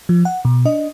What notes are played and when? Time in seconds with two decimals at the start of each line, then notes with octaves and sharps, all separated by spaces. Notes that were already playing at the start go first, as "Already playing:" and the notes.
0.09 F3
0.25 F#5
0.45 B2
0.65 D4 D#5